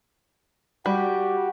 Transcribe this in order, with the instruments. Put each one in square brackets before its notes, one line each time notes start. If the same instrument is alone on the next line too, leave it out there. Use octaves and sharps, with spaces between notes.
[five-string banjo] G3 [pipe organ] F#4 G4